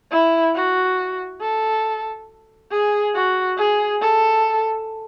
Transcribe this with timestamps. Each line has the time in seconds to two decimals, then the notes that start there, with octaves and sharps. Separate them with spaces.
0.11 E4
0.55 F#4
1.41 A4
2.71 G#4
3.15 F#4
3.57 G#4
4.01 A4